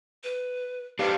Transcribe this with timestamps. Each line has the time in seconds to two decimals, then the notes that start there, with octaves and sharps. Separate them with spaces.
0.23 B4
0.99 D4 D#4 G4 B4 C5 F5